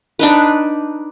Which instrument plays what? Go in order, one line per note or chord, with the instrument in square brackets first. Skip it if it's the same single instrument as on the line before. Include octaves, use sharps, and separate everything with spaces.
[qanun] D4 D#4 B4